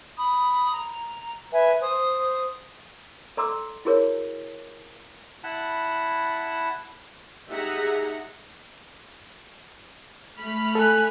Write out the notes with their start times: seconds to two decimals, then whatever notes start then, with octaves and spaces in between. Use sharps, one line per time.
0.16 B5 D#6
0.72 A#5
1.52 B4 E5 G#5
1.80 C5 D#6
3.37 A4 D5 A#5 C6 D6 E6
3.85 E4 F#4 G#4 A#4 C#5
5.44 E4 F#5 A5 B5
7.49 D#4 G4 G#4 E5 F#5 A#5
10.39 A3 B5 F6
10.75 A4 G#5 F#6